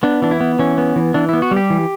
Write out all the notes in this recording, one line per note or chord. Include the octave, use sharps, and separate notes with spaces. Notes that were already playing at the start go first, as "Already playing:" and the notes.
B3 D4
E3 D4
E4
B3
E3 C#4
B3
E3
E3 D4
B3 E4
F#4
G3
G4
E3